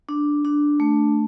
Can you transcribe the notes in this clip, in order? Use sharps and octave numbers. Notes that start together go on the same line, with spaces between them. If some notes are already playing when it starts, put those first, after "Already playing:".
D4
D4
A3